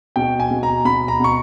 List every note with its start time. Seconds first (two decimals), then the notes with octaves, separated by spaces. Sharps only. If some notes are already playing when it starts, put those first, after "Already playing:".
0.16 B2 G5
0.40 G#5
0.51 B2
0.63 A#5
0.85 B2 B5
1.08 A#5
1.20 B2 C#6